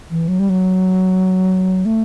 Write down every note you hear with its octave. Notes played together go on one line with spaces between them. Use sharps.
E3
F#3
G3
F#3
A3